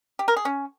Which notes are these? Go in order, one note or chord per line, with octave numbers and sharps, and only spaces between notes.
G4
A#4
G#4
C#4